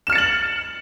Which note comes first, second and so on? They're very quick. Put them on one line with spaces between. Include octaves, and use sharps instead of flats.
E7 F6 C#7 A6 F#7